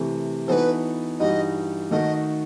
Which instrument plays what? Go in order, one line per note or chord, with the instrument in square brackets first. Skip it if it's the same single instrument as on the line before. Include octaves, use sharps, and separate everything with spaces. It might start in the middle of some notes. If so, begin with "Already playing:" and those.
Already playing: [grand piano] C3 E3 A3
[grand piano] E3 B3 D#4 F#4 A4 [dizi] B4 C5
[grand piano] G2 E3 G3 D#4 F#4 [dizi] D#5
[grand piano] D#3 A3 D#4 F#4 A4 [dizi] D#5